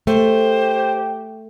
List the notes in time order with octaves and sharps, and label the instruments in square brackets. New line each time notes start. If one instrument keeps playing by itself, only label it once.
[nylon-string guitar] A3 [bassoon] G4 [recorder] C5